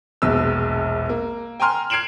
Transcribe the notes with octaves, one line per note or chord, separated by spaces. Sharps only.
E1 A#1 B2 E6
A#3
G5 G#5 A#5 C6 F6
F6 G#6 C7 D7 E7 F#7